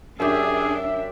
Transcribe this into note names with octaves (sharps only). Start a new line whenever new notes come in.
F#2 D4 G4 G#4 E5